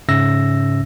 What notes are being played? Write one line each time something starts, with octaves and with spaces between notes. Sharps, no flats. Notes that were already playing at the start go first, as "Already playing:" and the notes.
G#2 C#3 C#4 E5 E6 A#6